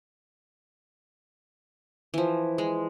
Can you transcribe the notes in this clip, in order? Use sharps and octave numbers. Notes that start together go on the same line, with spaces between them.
E3 F3
G#3